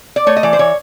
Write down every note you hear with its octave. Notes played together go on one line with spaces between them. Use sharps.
D5
A3 C#5
D#5
E3 D5
C5
E3 C#5